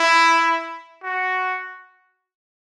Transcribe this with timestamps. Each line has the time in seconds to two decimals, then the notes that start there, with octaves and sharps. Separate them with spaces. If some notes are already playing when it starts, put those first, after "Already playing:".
Already playing: E4
1.04 F#4